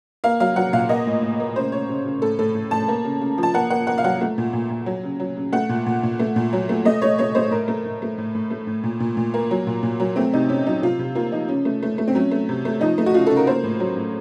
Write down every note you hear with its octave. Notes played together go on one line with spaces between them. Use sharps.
A#3 F5
F#3 F5
F#3 F#5
A#2 F5
A#3 D#5
A2
A2
A#3
C#3 C5
C#3 C#5
C#3
C#3
A2 A4
A2 A4
A2
A2 A5
A#3
C#3
C#3
F3
A5
A#3 F#5
A#3 F#5
A#3 F#5
F5
F#3 F#5
A3
A#2
A#2
A#2
F#3
C#3
F#3
C#3
A3 F#5
A#2
A#2
A#2
A3
A#2
F#3
A3
A3 D#5
A3 C#5
A3 C#5
A3 C5
A2 A#4
A3
A2
A3
A2
A2
A3
A2
A#2
A#2
A#2
A#3
F#3
A#2
A#2
F#3
A3 C4
C3 D#4
C3 C#4
F#3 D#4
C3 F4
C3
A#3 F4
F3 D#4
C#3 C#4
A3
A3
A3
C4
F#3 C#4
A3
C3
A3
F3 D#4
A3
F#4
C#3 F4
C#3 A4
A#4
A#3 C5
A2
F#3
A2